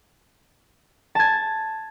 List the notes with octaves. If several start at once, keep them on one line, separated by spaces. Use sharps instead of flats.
A5 G#6